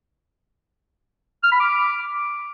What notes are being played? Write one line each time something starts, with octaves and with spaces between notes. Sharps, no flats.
F6
B5
D6